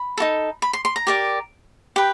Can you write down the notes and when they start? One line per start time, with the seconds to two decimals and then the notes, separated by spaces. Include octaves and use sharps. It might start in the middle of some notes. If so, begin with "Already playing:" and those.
Already playing: B5
0.18 D#4 F#4 A4
0.62 B5
0.73 C6
0.85 C6
0.96 A#5
1.07 G4 A#4 D5
1.96 G4 B4 G5